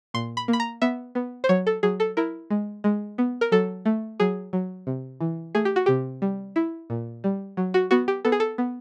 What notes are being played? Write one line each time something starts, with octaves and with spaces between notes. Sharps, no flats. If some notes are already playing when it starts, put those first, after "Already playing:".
A#2 C6
B5
A#3
B5
A#5
B3 E5
B3
C5
F#3 C#5
A4
F#3 G#4
A4
E4 A#4
G#3
G#3
B3
A#4
F#3 A4
A3
F#3 G#4
F#3
C3
E3
A3 G#4
G4
F#4
C3 G4
G3
E4
A#2
G3
F#3
F#4
B3 F#4
G4
B3 A4
G#4
A4
B3